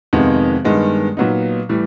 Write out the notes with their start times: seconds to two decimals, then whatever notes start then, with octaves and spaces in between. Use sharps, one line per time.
0.13 F2 C3 D#3 G#3 B3
0.65 G2 D#3 G#3 B3
1.17 A#2 F#3 B3 D#4
1.69 A2 E3 G3